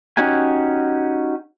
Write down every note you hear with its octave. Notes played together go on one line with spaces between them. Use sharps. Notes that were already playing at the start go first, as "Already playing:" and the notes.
C#4 D#4 F#4 G4 G#5